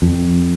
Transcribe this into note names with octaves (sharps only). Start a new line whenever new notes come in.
F2